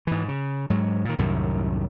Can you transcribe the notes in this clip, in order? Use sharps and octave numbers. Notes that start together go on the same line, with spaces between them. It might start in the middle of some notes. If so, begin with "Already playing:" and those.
G#2 E3
C#3
G#2 F#3
A#2 D#3
C2 F#2 A2 D#3